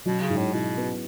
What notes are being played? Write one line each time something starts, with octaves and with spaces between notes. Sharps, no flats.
B2 F#3
C#3
G#2
A2
B2 E4
B3